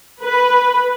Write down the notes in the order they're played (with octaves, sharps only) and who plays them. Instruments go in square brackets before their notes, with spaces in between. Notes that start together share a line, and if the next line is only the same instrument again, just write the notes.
[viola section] B4